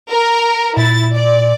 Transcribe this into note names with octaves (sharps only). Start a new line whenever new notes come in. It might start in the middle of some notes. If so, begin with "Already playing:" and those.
A#4
A#2 E4 A6
D5